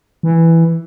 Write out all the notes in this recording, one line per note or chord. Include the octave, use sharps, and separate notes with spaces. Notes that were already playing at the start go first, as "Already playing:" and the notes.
E3